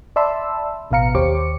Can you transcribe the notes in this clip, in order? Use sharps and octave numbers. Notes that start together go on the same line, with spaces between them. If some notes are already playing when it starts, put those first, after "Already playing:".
D5 E5 A5 B5 C6 E6
A1 B2 B3 F5 A#5 C#7
D#2 G4 C5 C#5 D6 C#7